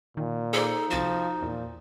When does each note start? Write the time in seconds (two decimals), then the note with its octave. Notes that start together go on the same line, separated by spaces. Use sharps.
0.17 A#2 D#3
0.53 D#4 G#4 A4 C5 D5
0.91 C2 F3 F#4 A6 E7
1.42 E2 A#2